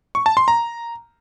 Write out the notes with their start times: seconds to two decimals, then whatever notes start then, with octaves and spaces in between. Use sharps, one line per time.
0.15 C#6
0.26 A5
0.37 C6
0.48 A#5